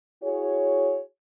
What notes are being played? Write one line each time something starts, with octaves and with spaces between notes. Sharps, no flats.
E4 F#4 G#4 C#5